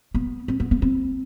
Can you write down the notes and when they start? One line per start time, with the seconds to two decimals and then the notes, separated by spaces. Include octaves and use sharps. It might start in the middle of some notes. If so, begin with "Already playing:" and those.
0.15 B3
0.48 C4
0.60 B3
0.71 B3
0.82 C4